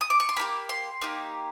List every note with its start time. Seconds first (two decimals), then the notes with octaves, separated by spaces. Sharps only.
0.01 D#6
0.10 D6
0.20 C#6
0.29 C6
0.36 A#3 D#4 G4 B5
0.69 C6
1.01 A#3 D#4 G4